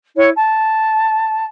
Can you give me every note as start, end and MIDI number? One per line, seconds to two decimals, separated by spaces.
0.16 0.29 64
0.16 0.29 73
0.34 1.45 81